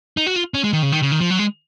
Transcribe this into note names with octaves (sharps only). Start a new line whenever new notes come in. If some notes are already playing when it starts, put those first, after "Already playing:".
D#4
F#4
F4
C#4
G#3
D#3
C#3
D#3
C#3
D#3
F3
F#3
G#3